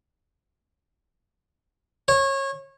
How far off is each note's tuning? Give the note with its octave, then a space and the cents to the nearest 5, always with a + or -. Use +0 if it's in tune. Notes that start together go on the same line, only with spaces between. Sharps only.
C#5 -25